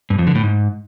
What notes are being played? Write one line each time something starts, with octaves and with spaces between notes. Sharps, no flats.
G2
F2
D3
A2
G#2